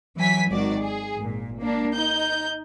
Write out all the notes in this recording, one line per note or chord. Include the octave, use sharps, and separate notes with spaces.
E3 F#3 G#5 B6
G#1 D#3 F#4 D5
G#4
G#1 A#2
A#3 D4
D#4 G6